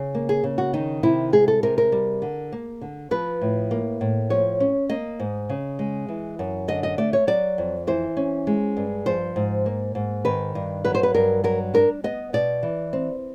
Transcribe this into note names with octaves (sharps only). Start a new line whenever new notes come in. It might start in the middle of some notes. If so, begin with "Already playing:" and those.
Already playing: C#3
A#3
G#4
C#3
F#4
D#3 D#4
C3 E4
G#3 G#4
A4
C3 A#4
A#4
G3
D3
A#3
D3
F3 B4
A2
A#3
A2
F3 C#5
C#4
A#3 D#5
G#2
C#3
G#3
E3
F#2
D3 D#5
D#5
A3 D5
C#5
F#3 D5
F2
E3 C5
C#4
G#3
G2
F3 C5
G#2
A#3
G#2
D#3 B4
G2
F#3 B4
C5
B4
G2 A#4
F#3 A#4
D4 A#4
B3 D#5
B2 D5
E3
C4